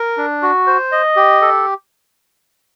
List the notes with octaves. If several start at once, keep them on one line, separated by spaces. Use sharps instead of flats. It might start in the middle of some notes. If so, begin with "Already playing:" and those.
Already playing: A#4
D4
F#4
C5
D#5
G4
A4